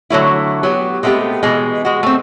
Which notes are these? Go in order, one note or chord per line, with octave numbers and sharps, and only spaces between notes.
D3 F#3 A3 E4
F#3 B3 G4
G#3 A3 B3 C4 G4
B2 E3 G#3
G#3 F#4
A3 C4